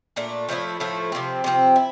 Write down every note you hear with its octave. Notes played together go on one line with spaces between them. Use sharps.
A#2 A3 D4
A2 F3 A3 E4
A2 F3 A3 E4
C3 F3 C4
C3 F3 C4
E4